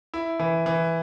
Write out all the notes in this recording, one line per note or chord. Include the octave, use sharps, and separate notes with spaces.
E4
E3
E3